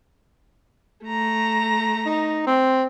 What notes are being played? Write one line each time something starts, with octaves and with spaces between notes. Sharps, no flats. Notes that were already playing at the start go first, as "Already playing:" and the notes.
A3 A#5
D#4
C4